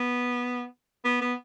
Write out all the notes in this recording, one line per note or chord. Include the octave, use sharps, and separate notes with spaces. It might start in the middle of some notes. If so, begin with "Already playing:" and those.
Already playing: B3
B3
B3